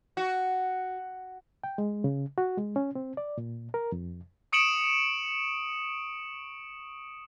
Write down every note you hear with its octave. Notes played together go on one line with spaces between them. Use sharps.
F#4
G5
G#3
C#3
F#4
G#3
C#4
C4
D5
A#2
A#4
F2
C#6 D#6 C#7 D7 E7 F#7